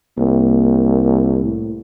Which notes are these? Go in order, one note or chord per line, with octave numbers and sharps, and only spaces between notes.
C2 A#3
A2